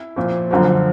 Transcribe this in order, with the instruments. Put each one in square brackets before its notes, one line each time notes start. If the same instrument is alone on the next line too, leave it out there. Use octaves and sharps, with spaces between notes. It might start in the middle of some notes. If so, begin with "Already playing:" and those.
Already playing: [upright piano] E4
A#2 F3
F#2 D3 F3